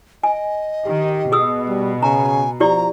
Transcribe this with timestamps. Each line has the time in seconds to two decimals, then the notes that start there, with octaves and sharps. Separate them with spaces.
0.23 D#5 G#5
0.86 D#3 G4
1.32 B2 G#4 D#6 E6
1.68 G3
2.03 C#3 G#5 A#5
2.60 F3 E4 G4 D5 A#5